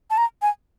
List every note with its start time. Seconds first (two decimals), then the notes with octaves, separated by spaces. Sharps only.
0.10 A5
0.17 A#5
0.42 G#5